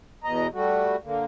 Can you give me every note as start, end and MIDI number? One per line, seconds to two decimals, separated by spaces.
0.24 0.47 40
0.24 0.47 47
0.24 0.47 75
0.24 0.47 82
0.53 0.96 55
0.53 0.96 57
0.53 0.96 66
1.04 1.25 50
1.04 1.25 58